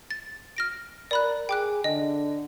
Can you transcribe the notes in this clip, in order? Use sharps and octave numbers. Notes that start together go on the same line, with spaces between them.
A6
F6 A#6 D7
A#4 D5 B5 F#6
G#4 G5 D6 F#6
D3 D#5